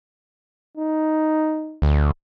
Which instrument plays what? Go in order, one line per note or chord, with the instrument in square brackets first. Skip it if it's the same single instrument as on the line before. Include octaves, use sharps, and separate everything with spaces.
[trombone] D#4
[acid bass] D2